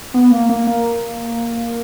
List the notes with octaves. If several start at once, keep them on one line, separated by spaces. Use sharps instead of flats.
B3
A#3
A#3
A#3